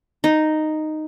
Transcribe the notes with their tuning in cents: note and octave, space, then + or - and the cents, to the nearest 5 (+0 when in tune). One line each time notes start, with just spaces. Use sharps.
D#4 -5